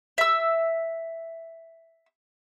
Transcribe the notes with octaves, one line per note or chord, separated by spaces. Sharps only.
E5 E6